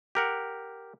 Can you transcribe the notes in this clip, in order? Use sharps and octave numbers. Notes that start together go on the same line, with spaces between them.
G4 A#4 F#5